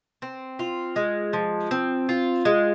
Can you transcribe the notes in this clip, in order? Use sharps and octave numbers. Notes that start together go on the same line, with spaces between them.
C4
F4
G#3
F3
C4
F4
G#3